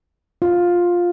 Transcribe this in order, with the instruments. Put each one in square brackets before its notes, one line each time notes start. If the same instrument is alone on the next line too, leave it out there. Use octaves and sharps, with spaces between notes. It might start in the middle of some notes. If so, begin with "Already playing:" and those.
[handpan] F4